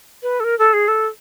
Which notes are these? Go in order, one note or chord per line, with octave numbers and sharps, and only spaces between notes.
B4
A4
A#4
A4
G#4
A4